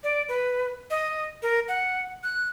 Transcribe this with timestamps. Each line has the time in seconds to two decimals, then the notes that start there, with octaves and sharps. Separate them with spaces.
0.04 D5
0.29 B4
0.90 D#5
1.42 A#4
1.68 F#5
2.24 F#6